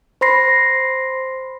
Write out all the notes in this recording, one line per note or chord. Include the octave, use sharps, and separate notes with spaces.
C5 B5 C6 A#6 C7